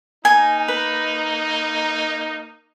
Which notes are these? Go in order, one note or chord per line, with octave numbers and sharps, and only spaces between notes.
A#3 D#4 G#5
B4